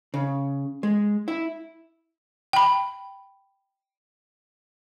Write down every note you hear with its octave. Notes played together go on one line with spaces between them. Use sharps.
C#3
G#3
E4
G5 B5